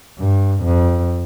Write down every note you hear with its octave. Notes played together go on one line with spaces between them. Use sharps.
G2
F2